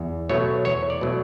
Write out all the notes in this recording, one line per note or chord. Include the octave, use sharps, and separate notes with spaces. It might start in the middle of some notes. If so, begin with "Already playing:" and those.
Already playing: E2
B2 F#3 A3 C#5
E2 C#5
D5
B2 F#3 A3